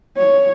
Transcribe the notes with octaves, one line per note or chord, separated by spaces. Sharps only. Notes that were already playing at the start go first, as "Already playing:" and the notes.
C#5